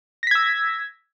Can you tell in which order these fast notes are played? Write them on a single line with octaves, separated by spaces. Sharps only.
A#6 B6 G#6 E6